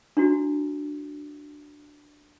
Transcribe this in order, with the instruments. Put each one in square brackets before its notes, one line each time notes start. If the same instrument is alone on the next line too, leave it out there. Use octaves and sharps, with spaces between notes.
[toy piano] D4 E4 F#4